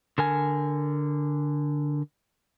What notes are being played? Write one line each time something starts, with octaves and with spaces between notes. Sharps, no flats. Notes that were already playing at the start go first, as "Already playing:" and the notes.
D3 A#4 G#5